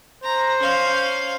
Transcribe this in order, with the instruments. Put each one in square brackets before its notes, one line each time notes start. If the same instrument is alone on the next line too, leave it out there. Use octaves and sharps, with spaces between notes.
[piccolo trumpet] C5 [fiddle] A#5
[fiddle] C#4 F5